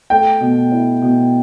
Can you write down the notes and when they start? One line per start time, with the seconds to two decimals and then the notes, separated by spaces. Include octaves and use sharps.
0.10 A3 G5
0.41 B2
0.72 E4
1.02 B2